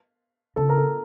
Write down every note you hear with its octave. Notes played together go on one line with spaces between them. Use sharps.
C#3 A4
A#4
A4